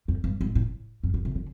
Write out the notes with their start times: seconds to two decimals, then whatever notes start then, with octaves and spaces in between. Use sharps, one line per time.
0.08 F2
0.24 G2
0.41 G#2
0.55 A2
1.04 F#2
1.14 G2
1.25 C3
1.35 D3